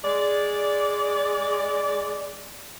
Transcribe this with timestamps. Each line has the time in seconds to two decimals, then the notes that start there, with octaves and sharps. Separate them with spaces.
0.05 G#3 D5